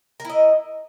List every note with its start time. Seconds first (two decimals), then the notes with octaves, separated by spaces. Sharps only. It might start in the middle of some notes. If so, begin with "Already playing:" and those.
0.20 A#4
0.25 E4
0.30 D#5